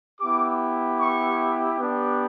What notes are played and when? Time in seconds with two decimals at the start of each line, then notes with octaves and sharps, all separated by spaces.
0.20 B3 E4 G4 D6
1.00 C#6
1.80 B3 D4 G4